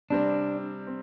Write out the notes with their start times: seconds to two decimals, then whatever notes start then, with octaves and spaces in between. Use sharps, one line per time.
0.10 C3 G3 C4 D4
0.87 C4